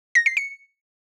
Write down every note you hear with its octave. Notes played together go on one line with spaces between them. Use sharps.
A#6
C7
C#7